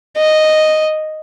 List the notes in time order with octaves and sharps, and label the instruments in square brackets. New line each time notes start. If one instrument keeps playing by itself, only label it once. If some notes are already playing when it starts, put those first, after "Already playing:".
[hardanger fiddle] D#5